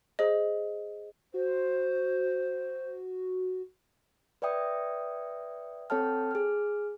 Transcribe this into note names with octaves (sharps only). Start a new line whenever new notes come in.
G#4 C5 D#5
F#4 C5
B4 D5 E5 G5 D#6
C4 A4 C#5 G5 A5 F6
G#4 F6